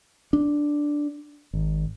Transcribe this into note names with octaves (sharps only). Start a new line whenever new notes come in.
D4
G#1